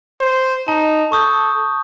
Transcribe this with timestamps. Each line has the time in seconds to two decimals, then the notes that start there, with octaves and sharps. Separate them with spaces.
0.20 C5
0.68 D#4 A5
1.12 A4 C#6 D#6 G6